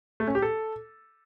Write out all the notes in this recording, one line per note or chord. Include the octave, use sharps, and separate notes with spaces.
A3
C#4
G4
A4